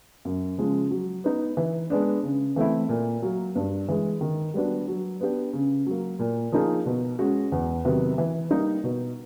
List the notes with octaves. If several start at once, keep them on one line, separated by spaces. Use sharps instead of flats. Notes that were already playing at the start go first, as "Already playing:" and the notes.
F#2
C#3 F3 G#3
F#3
B3 D#4
E3
G#3 B3 D4
C#3
E3 A3 C4 E4
A#2
F#3 A#3
G2
E3 G#3
D#3
G3 B3 D4 F#4
F#3
B3 D4 G4
C#3
F#3 A#3
A#2
F3 A#3 D#4 G#4
B2
G#3 C#4 F#4
E2
C3 D#3 F#3 B3
E3
G3 A#3 D#4
B2